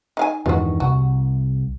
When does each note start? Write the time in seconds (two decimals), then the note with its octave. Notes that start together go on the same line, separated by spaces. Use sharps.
0.17 D#4 F5 G#5
0.46 E2 G2 D#3 G#3 F#4
0.80 C2 F#4